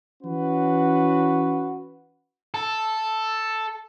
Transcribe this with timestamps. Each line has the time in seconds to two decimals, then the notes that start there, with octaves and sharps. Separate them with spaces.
0.22 E3 C#4 F#4 B4
2.54 A4